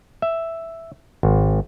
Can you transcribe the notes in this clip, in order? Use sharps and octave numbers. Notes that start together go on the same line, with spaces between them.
E5
G#1